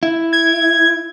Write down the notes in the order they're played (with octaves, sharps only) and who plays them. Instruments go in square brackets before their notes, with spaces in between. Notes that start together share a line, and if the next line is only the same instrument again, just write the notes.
[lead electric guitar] E4
[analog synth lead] G#6